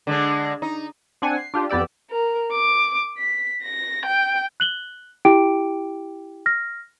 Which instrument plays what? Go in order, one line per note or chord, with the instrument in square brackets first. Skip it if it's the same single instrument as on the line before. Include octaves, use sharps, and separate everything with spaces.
[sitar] D3 G#3 D4
D#4
[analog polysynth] C4 D4 F#5 G#5
C7
D4 F4 G4
F2 B3 G4 D5 E6
[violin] A#4
D6
B6
A#6
G5
[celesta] F#6 F#7 G7
E4 G4 G5 D6 D7
F6 A#6